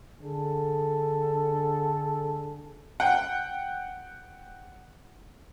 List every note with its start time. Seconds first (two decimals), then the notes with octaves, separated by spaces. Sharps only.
0.22 D3 G#4 A4
3.00 F#5 G5